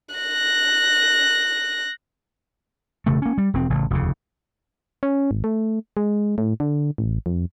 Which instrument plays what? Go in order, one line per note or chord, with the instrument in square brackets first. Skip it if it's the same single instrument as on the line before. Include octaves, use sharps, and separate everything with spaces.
[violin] F#6 A#6
[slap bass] E1 C#3 A3
A#3 C#4
G3
E1 C4
A1 C#3
F1 D#2 C#3
[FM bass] C#4
G#1
A3
G#3
A2
D3
A1
F2